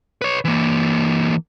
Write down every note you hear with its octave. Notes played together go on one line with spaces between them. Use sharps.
B4 C#5
E3 A#3